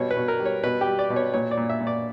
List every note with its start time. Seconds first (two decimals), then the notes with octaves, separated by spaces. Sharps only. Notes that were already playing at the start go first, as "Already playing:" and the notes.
Already playing: B2 G3 C#5
0.11 B4
0.17 B2
0.28 A#4
0.40 G3
0.45 C#5
0.63 B2 B4
0.81 G4
0.87 G3
0.99 D5
1.10 B2
1.16 C#5
1.34 A#2 C#5
1.51 D5
1.57 A#2
1.69 E5
1.80 A#2
1.87 D5